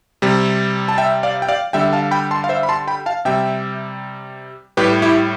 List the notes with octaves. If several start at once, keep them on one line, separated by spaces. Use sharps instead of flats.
C3 G3
A5
E5 G5
D5 F5
G5
D5 F5
D3 G3 E5 G5
F5 A5
G5 B5
A5 C6
F5
C5 E5
B5
A5 C6
G5 B5
F5 A5
C3 G3 E5 G5
A2 G3 G4 B4
E4 G4